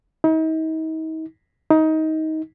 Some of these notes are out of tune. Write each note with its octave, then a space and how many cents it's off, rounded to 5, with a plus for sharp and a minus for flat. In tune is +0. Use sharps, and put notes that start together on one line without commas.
D#4 +40
D#4 +20